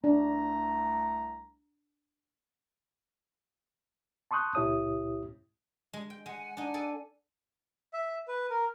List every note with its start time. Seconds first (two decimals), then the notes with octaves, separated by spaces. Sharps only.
0.04 C2 A3 D4 A#5
4.31 A5 C6 C#6 D#6 F#6 G6
4.55 C#2 A#2 E4 G4 C#5 D#6
5.93 G#3
6.10 G5
6.26 G#3 F#5 G#5
6.57 D4 D#4 F#5 G#5
6.74 G#4 A4 D5
7.93 E5
8.28 B4
8.50 A#4